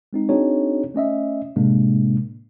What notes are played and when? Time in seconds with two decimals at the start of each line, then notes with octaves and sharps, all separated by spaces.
0.13 G#3 C4 D#4
0.29 C4 D4 D#4 F#4 G#4 C#5
0.95 A3 C#4 D#5 E5
1.56 A2 C3 G#3 A#3 D4